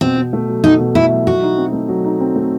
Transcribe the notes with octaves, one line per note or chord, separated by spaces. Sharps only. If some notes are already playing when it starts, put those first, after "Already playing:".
B2 C4
B2
A3
F#3
B2 D#4
B2
A3 E4
F#3
F#3 F#4
D#4
C4
A3
F#3
D#4
C4
A3